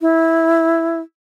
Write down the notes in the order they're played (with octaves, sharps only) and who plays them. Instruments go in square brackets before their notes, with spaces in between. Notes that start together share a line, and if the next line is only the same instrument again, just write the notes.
[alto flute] E4